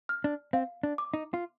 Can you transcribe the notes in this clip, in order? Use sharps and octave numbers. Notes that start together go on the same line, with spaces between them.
F6
D4
C4 F5
D4
D6
D#4
F4